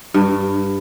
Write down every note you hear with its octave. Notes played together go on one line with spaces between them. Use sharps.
G2